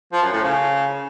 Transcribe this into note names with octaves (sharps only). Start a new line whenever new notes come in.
F3
F#2
A2
C#3